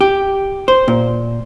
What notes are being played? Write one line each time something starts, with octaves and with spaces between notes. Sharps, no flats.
G4
C5
A#2